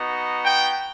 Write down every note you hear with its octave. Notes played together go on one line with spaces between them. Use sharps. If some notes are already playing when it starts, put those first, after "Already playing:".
Already playing: B3 D#4 F#4
G5